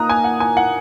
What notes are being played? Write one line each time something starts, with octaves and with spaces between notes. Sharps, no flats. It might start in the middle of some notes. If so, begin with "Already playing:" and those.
Already playing: A#2 A#3 D#4 A#5 D#6 F#6
G#5
F#5
G#5
F#5